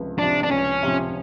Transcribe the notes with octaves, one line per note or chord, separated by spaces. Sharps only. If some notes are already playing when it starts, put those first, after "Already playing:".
Already playing: C#2 C3 F3
C3 F3 D4
D4
C#2 C#4
C3 F3